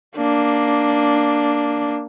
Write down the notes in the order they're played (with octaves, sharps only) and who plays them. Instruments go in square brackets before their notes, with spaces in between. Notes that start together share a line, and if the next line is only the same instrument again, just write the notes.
[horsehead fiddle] A#3 D4